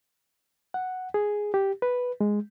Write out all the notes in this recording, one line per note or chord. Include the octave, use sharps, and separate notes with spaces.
F#5
G#4
G4
B4
G#3